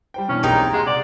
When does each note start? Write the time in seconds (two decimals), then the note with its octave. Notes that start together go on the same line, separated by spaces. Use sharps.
0.14 G3 C5 G5
0.29 B2 E3 C#4 D4
0.43 B1 A#2 G#3 C4 D#4 G4 A#5
0.73 G#3 F#5 C6
0.87 C3 D5